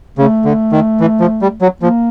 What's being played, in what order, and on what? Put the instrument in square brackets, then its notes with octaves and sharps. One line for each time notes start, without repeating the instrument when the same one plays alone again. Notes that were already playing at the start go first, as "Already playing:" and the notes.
[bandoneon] C#3 [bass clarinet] A3
[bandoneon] D3
D#3
E3
F3
G3
F#3
[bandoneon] F3 [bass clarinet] A#3